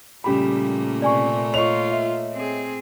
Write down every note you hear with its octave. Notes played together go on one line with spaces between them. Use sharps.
A#2 C#3 G3 A3 A#3 G4 B5
C3 D5 G#5 C#6
F4 C#5 D#5 C#6 F7
E5
C4 G#4